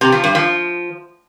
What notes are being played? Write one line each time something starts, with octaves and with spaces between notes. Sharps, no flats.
C3
F3
G2
F3